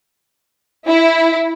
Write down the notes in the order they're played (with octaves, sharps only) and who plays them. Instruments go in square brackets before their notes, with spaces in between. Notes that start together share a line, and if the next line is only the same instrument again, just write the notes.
[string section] E4